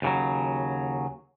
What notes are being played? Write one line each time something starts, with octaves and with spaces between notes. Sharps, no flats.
D#2 C#3 F#3